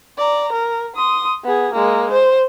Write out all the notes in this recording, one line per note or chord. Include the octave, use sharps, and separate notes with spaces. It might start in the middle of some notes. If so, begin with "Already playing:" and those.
D5 A#5
A#4
C6 D#6
B3 G#4
G#3 A#3
C5